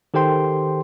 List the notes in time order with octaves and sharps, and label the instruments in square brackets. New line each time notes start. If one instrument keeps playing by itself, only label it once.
[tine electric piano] D#3 G4 A4 C5 G5 C6